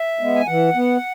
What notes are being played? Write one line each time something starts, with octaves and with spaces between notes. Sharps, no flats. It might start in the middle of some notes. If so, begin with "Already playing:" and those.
Already playing: E5
G#3 B3
G#5
E3 F#5
B3